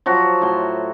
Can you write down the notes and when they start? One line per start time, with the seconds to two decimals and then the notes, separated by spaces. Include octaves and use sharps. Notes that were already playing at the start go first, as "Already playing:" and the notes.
0.06 F3 F#3 F#4
0.41 A2 F#4 C6